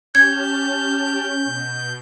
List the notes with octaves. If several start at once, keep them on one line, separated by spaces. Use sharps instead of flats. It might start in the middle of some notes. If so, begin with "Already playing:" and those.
C#4 G4 A5 F6 G6 G#6
B2